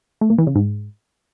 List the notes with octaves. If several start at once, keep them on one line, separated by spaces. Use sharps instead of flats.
A3
A#2
E3
C#3
G#2